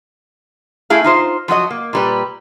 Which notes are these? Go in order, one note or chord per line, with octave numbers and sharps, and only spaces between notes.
A3 E4 G#4 F5
D#4 F4 C5
F3 F#3 F#4 D#5
A#3
A#2 G3 B4